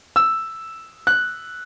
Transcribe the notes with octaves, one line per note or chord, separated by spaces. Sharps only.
E6
F#6